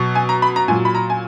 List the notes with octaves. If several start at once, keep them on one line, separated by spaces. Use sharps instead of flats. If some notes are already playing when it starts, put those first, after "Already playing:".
Already playing: B2 F#3
G#5
A#5
B5
A#5
A#2 F#3 G#5
B5
A#5
G#5